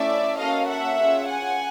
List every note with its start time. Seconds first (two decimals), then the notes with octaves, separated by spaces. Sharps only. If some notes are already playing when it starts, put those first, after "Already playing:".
Already playing: A3 C#4 E4 D5 E5
0.38 A#3 C#4 F#4 A4 D#5 F5
0.68 E5 F#5
0.98 C#4 F4 G#4
1.28 F#5 G#5